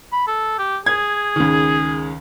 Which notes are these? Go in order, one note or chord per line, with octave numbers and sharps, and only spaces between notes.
B5
A4
G4
G#4 G#6
C#2 D#3